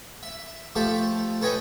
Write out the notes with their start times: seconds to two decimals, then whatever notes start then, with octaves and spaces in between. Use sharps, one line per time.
0.23 E5
0.75 F3 A3 G4 A4 E5
1.41 A4 B4 C#5 D#5 G5 G#5